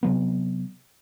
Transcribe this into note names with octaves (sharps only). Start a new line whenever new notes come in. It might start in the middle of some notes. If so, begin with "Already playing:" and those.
C3 F#3 B3